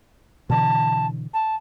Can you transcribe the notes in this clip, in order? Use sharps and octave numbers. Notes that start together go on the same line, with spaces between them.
B2 D3 E3 A5
A5